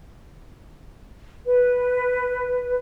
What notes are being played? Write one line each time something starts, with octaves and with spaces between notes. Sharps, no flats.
B4